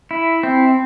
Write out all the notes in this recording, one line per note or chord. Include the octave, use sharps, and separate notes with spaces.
E4
C4